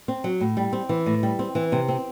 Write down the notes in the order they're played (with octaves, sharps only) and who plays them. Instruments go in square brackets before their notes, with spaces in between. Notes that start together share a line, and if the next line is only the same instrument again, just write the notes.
[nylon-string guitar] C4
F#3
A2
G3
C4
E3
A2
G3
C4
E3
C3
C4